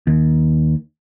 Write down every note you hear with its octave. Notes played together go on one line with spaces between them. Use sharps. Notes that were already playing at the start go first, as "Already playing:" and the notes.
D#2